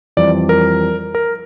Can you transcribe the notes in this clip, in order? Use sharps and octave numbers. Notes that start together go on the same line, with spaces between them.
F2 E3 G3 D5
A#4
A#4